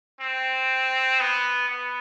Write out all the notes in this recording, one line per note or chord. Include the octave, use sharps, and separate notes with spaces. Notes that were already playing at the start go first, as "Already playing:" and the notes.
C4
B3
B3